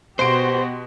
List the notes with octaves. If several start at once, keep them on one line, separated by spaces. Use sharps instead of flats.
B2 B3 F#4 G4 C5 C6 D7